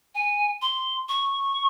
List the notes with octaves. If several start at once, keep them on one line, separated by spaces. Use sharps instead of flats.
G#5
C6
C#6